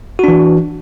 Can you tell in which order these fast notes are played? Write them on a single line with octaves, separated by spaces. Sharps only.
F#4 D4 E3